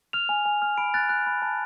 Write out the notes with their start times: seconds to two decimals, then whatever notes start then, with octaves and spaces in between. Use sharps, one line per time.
0.13 F6 F7
0.29 G#5
0.46 G#5
0.62 F6
0.78 B5 D7
0.94 F#6 A6
1.09 F#6
1.27 B5
1.42 A5